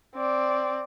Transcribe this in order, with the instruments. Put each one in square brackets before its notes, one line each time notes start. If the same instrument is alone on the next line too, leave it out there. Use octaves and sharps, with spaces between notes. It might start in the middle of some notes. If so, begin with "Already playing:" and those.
[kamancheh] C4 D5